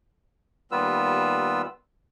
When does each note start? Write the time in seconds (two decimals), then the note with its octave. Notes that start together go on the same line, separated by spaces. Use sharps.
0.72 D#2 G3 B3 F4 B4 E6